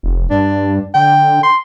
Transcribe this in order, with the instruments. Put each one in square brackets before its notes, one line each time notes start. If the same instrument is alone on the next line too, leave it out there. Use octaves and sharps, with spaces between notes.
[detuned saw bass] F1
[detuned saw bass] G2 [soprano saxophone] D4
[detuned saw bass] D3 [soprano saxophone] G5
[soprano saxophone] C6